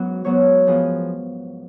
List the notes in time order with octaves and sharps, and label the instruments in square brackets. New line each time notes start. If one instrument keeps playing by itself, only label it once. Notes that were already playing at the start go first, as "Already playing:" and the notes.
Already playing: [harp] G#2 F#3 B3 C#4 F#4
G#2 F#3 B3 F#4 C#5
F3 B3 F4 G#4